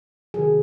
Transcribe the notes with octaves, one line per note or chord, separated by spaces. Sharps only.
C3 D#3 F#3 G#4